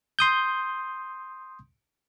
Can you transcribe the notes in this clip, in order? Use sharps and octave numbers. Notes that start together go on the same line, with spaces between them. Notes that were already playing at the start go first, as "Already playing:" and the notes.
C6 D#6 G6